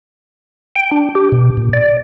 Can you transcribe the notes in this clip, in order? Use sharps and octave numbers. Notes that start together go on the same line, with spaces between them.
G5
D4
G4
B2
A#2
D5